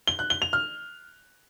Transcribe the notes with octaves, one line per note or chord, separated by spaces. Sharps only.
G7
F#6
G7
F7
F6